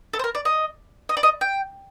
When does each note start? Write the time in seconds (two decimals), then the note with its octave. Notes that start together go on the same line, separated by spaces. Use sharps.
0.13 A4
0.19 C5
0.24 A#4
0.35 D5
0.45 D#5
1.09 D#5
1.17 D5
1.23 D#5
1.41 G5